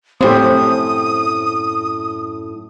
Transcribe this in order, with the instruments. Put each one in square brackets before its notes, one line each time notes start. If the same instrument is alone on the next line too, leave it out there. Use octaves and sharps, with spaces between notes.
[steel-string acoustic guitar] F#2 A2 [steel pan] C4 G4 [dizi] D#6